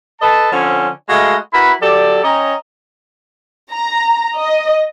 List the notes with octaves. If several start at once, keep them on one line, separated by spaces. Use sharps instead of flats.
A4 B4 D#5 A5
D3 F3 C4 C#4
G#3 A3 F#4 D#5 F5 B5
E4 F#4 A#4 B4 B5
F#3 G4 A4 D5
C#4 C#5 D#5 G5 A#5
A#5
D#5